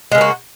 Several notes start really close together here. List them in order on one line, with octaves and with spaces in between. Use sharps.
G#3 C#3 A#3 F#4